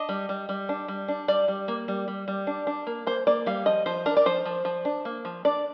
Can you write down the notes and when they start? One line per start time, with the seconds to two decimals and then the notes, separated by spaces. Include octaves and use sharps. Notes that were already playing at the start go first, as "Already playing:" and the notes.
Already playing: D4 D#5
0.09 G3
0.29 G3
0.49 G3
0.69 D4
0.88 G3
1.08 D4
1.28 G3 D5
1.48 G3
1.68 A#3
1.88 G3
2.08 G3
2.28 G3
2.47 D4
2.67 D4
2.87 A#3
3.07 A#3 C5
3.27 A#3 D5
3.46 G3 F5
3.66 F3 D#5
3.86 F3 C5
4.06 D4 A#4
4.17 D5
4.26 F3 C5
4.45 F3
4.65 F3
4.85 D4
5.05 A#3
5.25 F3
5.45 D4 D5